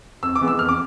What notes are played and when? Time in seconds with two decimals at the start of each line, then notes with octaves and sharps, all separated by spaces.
0.23 F2 E6
0.35 D6
0.41 E3 G#3 B3
0.48 E6
0.59 F2 F6
0.69 D6